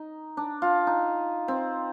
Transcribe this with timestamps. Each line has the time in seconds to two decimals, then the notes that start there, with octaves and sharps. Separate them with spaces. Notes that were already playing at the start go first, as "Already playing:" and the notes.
Already playing: D#4
0.37 D4
0.62 F4
0.87 D#4
1.48 C4